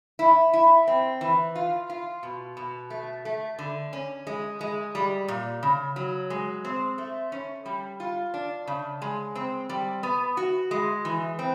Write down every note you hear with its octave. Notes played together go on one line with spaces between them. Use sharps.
E4
E4
C4
E3
F4
F4
B2
B2
A3
A3
D3
C#4
G#3
G#3
G3
A#2
C#3
F#3
G#3
C4
A3
C#4
G3
F4
D4
C#3
G#3
C4
G3
B3
F#4
G#3
E3
C4